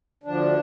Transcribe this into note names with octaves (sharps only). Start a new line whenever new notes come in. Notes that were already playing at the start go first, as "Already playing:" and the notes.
D2 D3 F3 D4